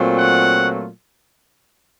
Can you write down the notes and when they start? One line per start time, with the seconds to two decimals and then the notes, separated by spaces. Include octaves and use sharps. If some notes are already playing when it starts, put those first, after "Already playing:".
Already playing: A#2 F#3 A3 C4 F4
0.17 F#5